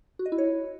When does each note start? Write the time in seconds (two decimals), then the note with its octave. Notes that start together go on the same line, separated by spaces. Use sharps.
0.19 F#4
0.26 D#5
0.32 E4
0.38 C#5